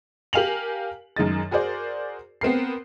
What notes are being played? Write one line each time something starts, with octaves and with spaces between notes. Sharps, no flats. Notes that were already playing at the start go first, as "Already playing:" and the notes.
G4 A#4 F5 G#5 F7 F#7
F#2 D#3 G#3 D#5 A6
F#4 G#4 A#4 C5 D5
B3 C4 A#4 C7